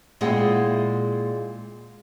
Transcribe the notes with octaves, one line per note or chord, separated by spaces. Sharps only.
A#2 G#3 C4 E4 G#4 F#5